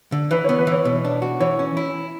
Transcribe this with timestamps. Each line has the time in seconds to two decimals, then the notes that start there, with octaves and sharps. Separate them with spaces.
0.12 D3
0.31 E3 B4
0.44 B3 C#5
0.58 B4
0.67 E3 C#5
0.85 B2
1.05 D4
1.22 F#4
1.40 E3 C#5
1.59 C#4
1.77 E4